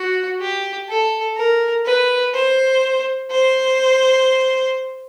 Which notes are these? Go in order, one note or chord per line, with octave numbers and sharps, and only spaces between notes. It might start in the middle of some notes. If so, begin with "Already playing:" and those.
Already playing: F#4
G4
A4
A#4
B4
C5
C5